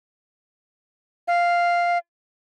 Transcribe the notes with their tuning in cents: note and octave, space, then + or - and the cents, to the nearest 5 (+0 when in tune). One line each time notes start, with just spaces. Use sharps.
F5 -5